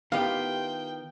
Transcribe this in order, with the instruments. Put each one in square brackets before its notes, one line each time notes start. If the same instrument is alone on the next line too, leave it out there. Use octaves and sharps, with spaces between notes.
[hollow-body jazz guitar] D#3 B3 E4 [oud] F4 G4 [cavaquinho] F5 [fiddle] G5